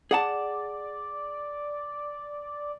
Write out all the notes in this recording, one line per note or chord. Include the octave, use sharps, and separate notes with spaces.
G#4 D5 F#5 A5